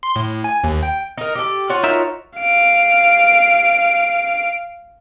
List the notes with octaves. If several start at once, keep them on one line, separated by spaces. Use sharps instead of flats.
C6
A2
G#5
D#2
G5
D#4 A#4
G4 A4
F4 F#4 C#5
D#4 A#4 E5
F5 D7